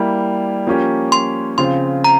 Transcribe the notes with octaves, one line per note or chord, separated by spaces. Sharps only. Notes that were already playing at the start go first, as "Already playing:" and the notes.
Already playing: G3 A#3 E4
F3 A#3 C#4 G4
C6
C#3 F3 C4 F4 C6
A#5